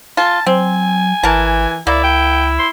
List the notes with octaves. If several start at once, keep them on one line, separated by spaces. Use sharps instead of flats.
F4 A5
F#3 C4 G#5
G#1 E3 A#4 A5
C#2 A#3 E4 D5
G5
C6